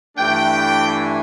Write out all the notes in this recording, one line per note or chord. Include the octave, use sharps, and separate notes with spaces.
G2 E3 A3 D4 G5
G#5